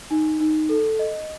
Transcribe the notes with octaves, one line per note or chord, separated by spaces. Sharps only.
D#4
D#4
A4
D#5